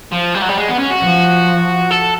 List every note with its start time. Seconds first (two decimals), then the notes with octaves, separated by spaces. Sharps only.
0.12 F3
0.35 G3
0.42 F#3
0.49 G3
0.57 G#3
0.68 B3
0.79 C#4
0.90 F#4
1.02 F3
1.91 A4